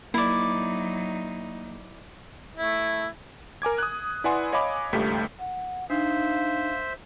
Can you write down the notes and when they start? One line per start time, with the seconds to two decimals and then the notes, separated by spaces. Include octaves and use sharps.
0.14 F#3 A#3 D#4 E4 D5
2.57 A3 E4
3.62 A#4 G#5 D6 G#6
3.78 D#6 F#6
4.24 E4 B4 D5 F#5 G#5 C6
4.53 C#5 D#5 F5 G#5 B5 D6
4.93 G#1 C#2 G2 A3 G4 B6
5.39 F#5
5.90 D4 D#4 C5 E5 F5